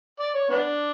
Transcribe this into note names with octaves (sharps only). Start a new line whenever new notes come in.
D5
C#5
B3 D4